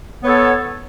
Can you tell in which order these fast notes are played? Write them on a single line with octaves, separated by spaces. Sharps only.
B3 C#5 A4